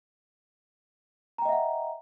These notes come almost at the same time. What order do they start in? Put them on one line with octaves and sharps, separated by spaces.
A#5 G5 D#5 E5 F#5